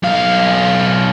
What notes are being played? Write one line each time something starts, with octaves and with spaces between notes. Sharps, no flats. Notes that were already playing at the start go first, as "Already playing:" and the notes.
B1 F5